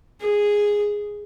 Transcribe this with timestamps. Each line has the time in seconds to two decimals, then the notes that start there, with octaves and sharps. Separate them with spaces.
0.21 G#4